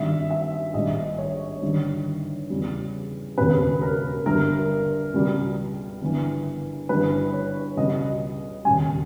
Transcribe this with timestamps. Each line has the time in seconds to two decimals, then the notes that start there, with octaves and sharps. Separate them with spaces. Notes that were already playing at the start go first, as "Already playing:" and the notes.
Already playing: G#1 G2 D#3 G3 E5
0.30 E5
0.74 A#1 G#2 D#3 G3 D#5
1.19 C#5
1.61 G1 G2 D#3 G3
2.50 E2 C#3 G3
3.38 E1 D#2 C#3 B4
3.82 A#4
4.26 G1 G2 G3 A#4
5.14 C#2 B2 G3
6.02 G1 G2 E3
6.89 G1 G2 E3 G3 B4
7.33 C#5
7.77 C#2 B2 G3 D#5
8.65 E1 D#2 C#3 G3 G#5